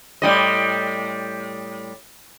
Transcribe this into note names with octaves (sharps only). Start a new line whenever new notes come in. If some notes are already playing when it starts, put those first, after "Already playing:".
A2 G3 D#5